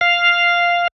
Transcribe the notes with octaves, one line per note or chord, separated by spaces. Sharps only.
F5